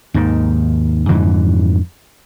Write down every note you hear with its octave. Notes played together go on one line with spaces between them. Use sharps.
D#2 G#2 D#3
F2 G#2 D3 E3